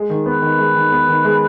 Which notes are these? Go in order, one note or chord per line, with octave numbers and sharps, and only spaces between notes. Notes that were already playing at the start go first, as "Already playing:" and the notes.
Already playing: G#3
D#3
B3 B4
D#3
G#3
D#3
B3
D#3
G#3